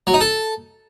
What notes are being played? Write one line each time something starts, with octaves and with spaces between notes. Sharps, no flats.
F#3
D#4
A4